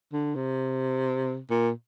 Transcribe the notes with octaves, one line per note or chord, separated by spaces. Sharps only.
D3
C3
A#2